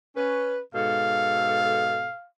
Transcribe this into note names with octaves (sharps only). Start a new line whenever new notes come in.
C#4 B4
G#2 B2 A4 F5